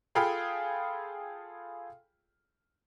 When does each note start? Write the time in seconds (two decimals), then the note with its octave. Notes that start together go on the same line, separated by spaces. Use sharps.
0.15 F4 G#4 A4 G5 B5 F6